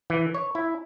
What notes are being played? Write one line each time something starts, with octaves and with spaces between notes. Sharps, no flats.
E3
C#5
E4